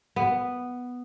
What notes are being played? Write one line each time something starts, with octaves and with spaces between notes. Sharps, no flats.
B3